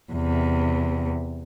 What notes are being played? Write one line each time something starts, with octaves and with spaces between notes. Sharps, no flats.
E2 C3